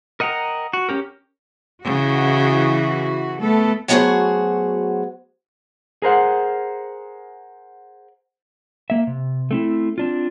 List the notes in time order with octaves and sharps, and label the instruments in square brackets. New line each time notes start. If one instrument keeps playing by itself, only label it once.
[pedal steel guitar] A#4 D#5 F#5 G5 A#5
F#4
C#4 G4 A#4
[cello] C#3 [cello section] E3 F#4
[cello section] A3 B3 A4
[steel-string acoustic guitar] F#3 A3 B3 F#4 G#4 C5
[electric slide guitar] G#4 A#4 C5 F#5
A#3 E5
C3
A3 C4 E4
C4 D4 F4